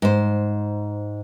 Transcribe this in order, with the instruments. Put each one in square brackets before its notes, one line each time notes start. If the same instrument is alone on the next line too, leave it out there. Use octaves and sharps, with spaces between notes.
[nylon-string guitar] G#2 C5